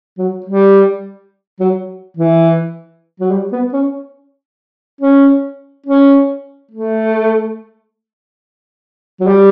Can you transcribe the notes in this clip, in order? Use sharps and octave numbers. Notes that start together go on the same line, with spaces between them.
F#3
G3
F#3
E3
F#3
G3
B3
C#4
C#4
C#4
A3
F#3
G3